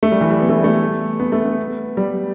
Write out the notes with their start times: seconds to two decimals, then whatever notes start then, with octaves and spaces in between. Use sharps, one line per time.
0.03 A3
0.12 G3
0.21 E3
0.30 G3
0.42 B3
0.49 A3
0.57 G3
0.64 A3
1.20 B3
1.32 A3
1.45 B3
1.97 G3